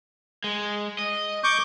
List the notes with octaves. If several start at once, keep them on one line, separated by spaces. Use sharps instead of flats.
G#3
D#5
C#6 D6 G6